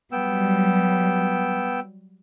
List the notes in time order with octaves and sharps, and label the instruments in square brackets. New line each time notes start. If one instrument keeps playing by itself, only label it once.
[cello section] F#3 G3 [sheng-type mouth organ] B3 G5 E6